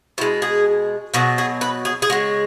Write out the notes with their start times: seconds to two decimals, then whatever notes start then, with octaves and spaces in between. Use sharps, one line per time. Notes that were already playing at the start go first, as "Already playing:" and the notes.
0.18 B2 E4
0.21 G#3
0.42 G#4
1.14 B2 F#3 F#4
1.38 G#4
1.61 B4
1.85 G#4
2.02 G#4
2.10 G#3 F#4
2.13 C#3